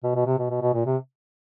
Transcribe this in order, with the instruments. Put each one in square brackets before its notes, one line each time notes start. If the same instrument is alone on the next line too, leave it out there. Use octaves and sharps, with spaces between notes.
[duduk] B2
B2
C3
B2
B2
B2
A#2
C3